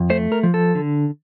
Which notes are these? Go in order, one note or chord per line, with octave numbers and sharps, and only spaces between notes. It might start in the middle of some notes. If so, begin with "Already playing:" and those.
Already playing: F2
A3 C5
A#4
F3
A4
D3